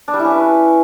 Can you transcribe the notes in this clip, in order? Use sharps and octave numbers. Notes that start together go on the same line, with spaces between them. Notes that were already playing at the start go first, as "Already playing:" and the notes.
D4
G3
E4
C#4
B4